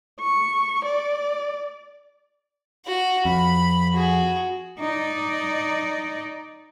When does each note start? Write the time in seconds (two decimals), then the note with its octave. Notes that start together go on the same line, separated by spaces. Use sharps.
0.20 C#6
0.85 D5
2.86 F#4 F#5
3.25 F2 B5
3.93 F#4 G#4
4.80 D#4 D5